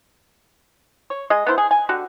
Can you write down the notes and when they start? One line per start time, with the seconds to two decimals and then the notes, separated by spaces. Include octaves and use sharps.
1.10 C#5
1.30 G#3 D#5
1.46 B3 D4 E4 C5
1.58 G#4
1.71 G#5
1.89 D3 F#4 G4